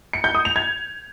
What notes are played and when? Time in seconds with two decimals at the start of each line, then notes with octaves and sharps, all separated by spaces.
0.13 C#7
0.24 G6
0.35 D#6
0.45 F7
0.56 G#6